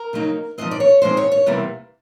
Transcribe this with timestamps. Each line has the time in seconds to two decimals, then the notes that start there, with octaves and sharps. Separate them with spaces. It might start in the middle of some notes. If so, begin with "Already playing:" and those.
Already playing: A#4
0.13 C#3 F#3 A#3 D#4
0.58 G#2 F3 G#3 C4 D#5
0.71 D5
0.80 C#5
1.02 G#2 F3 G#3 C4 C5
1.17 C#5
1.32 C#5
1.46 E2 C3 E3 G3 A#3